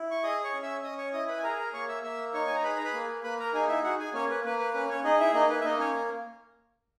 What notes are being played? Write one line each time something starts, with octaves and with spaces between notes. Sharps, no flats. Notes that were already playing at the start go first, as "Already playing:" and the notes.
Already playing: E4
C#6
G#4 D#5 D#6
C#5 C#6
C#4
E5 E6
C#4 D#5 D#6
C#5 C#6
E4 D#5 D#6
B4 B5
G#5
G#4 A#4 A#5
G#5
A#4 A#5
A#3 C#5 C#6
E5 E6
A#3 E5 E6
D#4 C#5 C#6
G#5
A#5
G#4 B4 B5
A#5
B4 B5
A#3
A#3 B4 B5
A#4 A#5
D#4 G#4 G#5
E4 E5
F#4 G#4 F#5
G#4 G#5
A#3 C#4 C#5
B4
A#3 B4
B4
C#4 B4
C#4 C#5
D#4 G#4 D#5
E4 E5
A#3 D#4 D#5
B4
E5
A#3 D#4 D#5
C#4 C#5